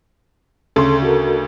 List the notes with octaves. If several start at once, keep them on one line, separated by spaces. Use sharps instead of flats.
D2 C#3 A4 C6
F#4 A4 A#4